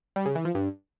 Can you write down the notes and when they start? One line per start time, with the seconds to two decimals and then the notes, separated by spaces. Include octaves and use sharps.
0.16 G3
0.26 C#3
0.35 E3
0.45 F3
0.55 G2